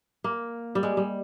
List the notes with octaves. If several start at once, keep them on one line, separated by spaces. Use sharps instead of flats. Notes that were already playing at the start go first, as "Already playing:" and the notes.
A#3
G3
G#3
G3